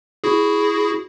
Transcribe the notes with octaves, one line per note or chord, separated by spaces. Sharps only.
E4 F#4 G#4